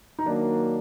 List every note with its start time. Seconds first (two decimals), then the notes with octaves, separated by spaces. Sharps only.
0.19 D#4
0.26 D#3 F#3 A#3 D4